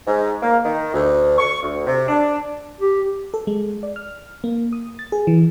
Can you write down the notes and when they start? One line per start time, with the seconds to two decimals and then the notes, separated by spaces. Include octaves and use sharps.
0.07 G#2
0.42 A#3
0.65 D#3
0.94 D2
1.38 C#6
1.63 D2
1.87 C3
2.08 D4
2.80 G4
3.34 A4
3.47 G#3
3.83 D5
3.96 F6
4.44 A#3
4.73 D#6
4.99 A6
5.12 G#4
5.27 E3